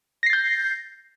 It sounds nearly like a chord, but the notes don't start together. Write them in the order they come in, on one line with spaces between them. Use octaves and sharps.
A#6 C7 A6 G6